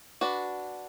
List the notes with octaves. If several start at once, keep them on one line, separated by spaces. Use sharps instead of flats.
D4 F#4 B4